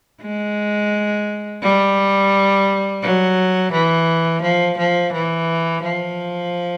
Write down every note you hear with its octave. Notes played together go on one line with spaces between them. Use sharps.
G#3
G3
F#3
E3
F3
F3
E3
F3